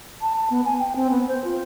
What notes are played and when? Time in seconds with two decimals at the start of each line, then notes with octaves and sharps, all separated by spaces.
0.22 A5
0.36 A5
0.50 B3
0.65 G#5
0.79 G5
0.96 C4
1.11 B3
1.28 C5
1.44 F4